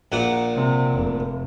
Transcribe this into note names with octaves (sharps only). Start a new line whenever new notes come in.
A#1 A#2 F#5
C3
F1